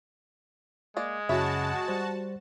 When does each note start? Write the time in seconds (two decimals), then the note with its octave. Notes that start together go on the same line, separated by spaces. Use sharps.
0.97 G#3 A#3 D5
1.29 F#2 C#3 E3 F#4 C#5 E5 A5 B5
1.88 G3 C5